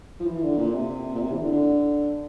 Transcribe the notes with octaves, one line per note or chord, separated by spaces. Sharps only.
F3
E3
D3
A#2
C3
A#2
C3
E3
D3
D3